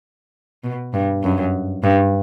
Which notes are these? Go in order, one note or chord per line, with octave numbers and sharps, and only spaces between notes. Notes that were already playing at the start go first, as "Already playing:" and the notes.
B2
G2
F#2
G2